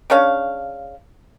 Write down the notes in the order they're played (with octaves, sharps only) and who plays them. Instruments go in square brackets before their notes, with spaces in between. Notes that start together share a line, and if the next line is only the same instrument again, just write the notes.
[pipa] C#3 D4 C#5 F5